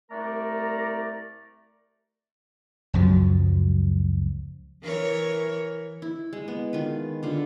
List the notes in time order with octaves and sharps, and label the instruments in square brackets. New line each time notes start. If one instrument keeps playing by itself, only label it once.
[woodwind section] C2 A3 A#4 D5 A#5
[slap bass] C#2 F#2 F3 F#3
[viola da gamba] E3 A#4 C#5
[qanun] E4
G#3
B3
D#3 F4 B4
D3 F4